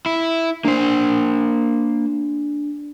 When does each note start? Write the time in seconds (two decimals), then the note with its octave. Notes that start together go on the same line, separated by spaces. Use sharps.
0.06 E4
0.65 A#3 D4 C5